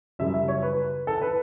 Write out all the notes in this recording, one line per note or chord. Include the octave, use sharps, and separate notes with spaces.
F#2 C#3 G3 E5
E5
C#5
B4
A4
B4